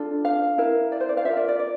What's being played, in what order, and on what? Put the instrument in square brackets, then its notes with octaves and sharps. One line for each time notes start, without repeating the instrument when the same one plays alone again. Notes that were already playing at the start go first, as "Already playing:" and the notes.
Already playing: [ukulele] D4 F4 A4
F5
E4 A#4 F5
D5
C5
D5
F5
F4 A#4 E5
D5
D5
D5